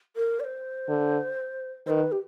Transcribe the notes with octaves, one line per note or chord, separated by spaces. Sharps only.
A#4
D5
C5
D3
D#3 B4 C5
G4